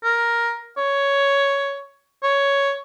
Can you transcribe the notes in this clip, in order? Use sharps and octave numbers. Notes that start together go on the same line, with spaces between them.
A#4
C#5
C#5